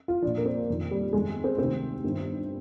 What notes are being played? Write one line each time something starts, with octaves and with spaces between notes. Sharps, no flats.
F4
A#1 A#2 F3 D4
A#3
C4
F1 F2 D#3
G3
G1 F2 D#3 G#3
C4
D2 C3 D#3 C4
G1 G2 D#3